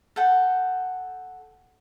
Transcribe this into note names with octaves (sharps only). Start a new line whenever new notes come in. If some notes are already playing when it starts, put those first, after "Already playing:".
A4 F#5 G5